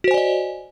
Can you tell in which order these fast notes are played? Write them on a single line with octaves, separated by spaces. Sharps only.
F#4 C5 G#5 D5 D#5